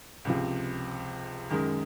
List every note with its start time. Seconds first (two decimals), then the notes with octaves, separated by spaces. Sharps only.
0.25 C#2 C3 F3
1.50 F#2 D#3 G#3